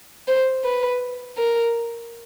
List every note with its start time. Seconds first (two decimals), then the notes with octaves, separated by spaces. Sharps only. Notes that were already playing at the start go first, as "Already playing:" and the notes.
0.28 C5
0.64 B4
1.37 A#4